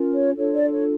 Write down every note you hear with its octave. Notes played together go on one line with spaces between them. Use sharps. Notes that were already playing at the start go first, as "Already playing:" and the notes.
Already playing: C#4 F4 A#4
C#5
D4 F4 A4 C#5
D5
C#5